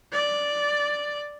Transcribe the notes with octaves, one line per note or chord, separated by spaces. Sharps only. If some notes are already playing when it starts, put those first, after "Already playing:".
D5